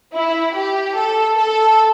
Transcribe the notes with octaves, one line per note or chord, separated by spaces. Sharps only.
E4
G4
A4
A4